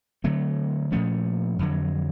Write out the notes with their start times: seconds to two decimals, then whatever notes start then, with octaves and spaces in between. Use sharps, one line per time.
0.24 D3 F#3 A3 C4
0.92 A#2 F3 A3 C#4
1.59 F2 D3 F#3